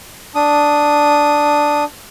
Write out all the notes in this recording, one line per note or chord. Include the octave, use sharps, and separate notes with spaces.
D4 D#6